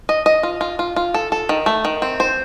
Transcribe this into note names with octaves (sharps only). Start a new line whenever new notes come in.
D#5
D#5
F4
F4
F4
F4
A4
A4
D#3
A3
D#3
C4
C5